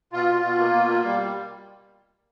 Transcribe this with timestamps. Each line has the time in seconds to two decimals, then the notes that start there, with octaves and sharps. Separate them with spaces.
0.13 B2 F4
0.28 B2
0.43 B2
0.59 A#3
0.73 B2
0.89 A#3
1.04 G3